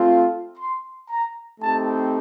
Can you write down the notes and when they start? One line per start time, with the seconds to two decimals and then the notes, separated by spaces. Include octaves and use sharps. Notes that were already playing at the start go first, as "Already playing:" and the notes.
Already playing: A3 C4 F4
0.58 C6
1.09 A#5
1.61 A3 C4 D#4 G4 A5